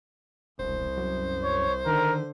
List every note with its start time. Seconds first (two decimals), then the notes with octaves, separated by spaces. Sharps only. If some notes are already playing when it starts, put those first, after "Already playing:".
0.59 E1 C2 C5
0.97 F#2
1.44 C#5
1.86 D3 D#3 A#4